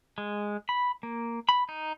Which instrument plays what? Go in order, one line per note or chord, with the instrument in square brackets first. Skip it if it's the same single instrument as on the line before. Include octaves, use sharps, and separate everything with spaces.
[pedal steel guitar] G#3
B5
A#3
B5
D#4